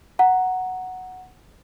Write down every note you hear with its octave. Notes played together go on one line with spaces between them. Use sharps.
F#5 A#5